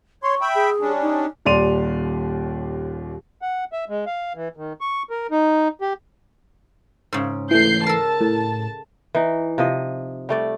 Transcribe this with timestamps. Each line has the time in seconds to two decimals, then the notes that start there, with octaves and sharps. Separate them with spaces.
0.23 C#5 C6 C#6
0.41 E5 G5 B5
0.55 G#4
0.81 G3 C#4 D4
1.02 D#4
1.45 D#1 D#2 D5 C6 D#7 F7
3.42 F#5
3.73 E5
3.89 G#3
4.06 F5
4.35 E3
4.57 D#3
4.81 C#6
5.10 A#4
5.31 D#4
5.81 G4
7.13 G#2 C#3
7.51 E3 A3 G6 C7
7.86 A4 A#4 A5
8.21 A2
9.15 E3 D#4
9.58 C3 F3 D#5
10.29 G3 A3 D5